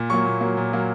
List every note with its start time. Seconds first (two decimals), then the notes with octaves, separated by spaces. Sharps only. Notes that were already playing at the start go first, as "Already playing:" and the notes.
Already playing: A#2
0.10 F#3 A#3 C#6
0.25 A#2
0.41 F#3 A#3
0.57 A#2
0.73 F#3 A#3